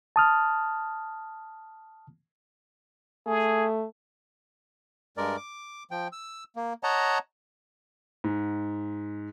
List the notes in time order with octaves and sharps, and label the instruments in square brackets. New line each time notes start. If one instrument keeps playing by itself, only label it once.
[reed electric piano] A5 D#6 F6
[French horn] A3 [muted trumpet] G#4
[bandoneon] G2 G#3 A#4 D5
D6
F3 G5
E6
A#3
C#5 D#5 F#5 A5 A#5
[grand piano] G#2